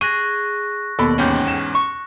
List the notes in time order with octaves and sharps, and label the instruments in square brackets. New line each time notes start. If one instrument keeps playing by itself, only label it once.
[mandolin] G#4 [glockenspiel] C#6 F#6 A#6 [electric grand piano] D#7
[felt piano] D#2 B2 B5 [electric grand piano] A4 [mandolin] D5
[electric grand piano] E2 G#2 C#4 [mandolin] A4 F#5 G5
[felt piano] E7
[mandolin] C#6